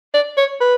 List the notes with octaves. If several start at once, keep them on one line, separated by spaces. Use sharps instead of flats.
D5
C#5
B4